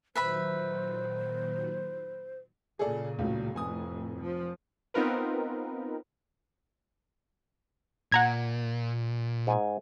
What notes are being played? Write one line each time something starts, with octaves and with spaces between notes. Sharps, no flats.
A#2 D#3 F#3 B4 C5 E5 B5
A#2 C#3 G#4 A4 D5
C#2 A2 F#3
F1 F2 A2 G#5 D#6
F3
B3 C4 D#4 F4 A#4 B4
A#2 F#5 A#5 G#6
G#2 G#5